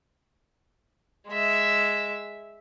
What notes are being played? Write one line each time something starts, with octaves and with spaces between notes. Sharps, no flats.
G#3 E5